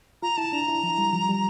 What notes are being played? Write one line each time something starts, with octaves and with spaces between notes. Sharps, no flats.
F4 A#5
E4 A5
D4 A#5
E4
F3
G3
F3
G3